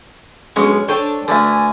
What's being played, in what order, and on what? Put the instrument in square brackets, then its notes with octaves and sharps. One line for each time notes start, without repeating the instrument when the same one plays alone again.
[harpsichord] B1 G#3 C#6 [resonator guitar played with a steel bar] C#4
[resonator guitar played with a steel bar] D4 A4 C5 [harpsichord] C#5 G5 G#5
[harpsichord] D2 D3 [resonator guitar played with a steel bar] B4 E5 [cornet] G#5